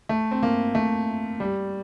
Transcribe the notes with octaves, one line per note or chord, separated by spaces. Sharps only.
A3
C4
A#3
A3
G3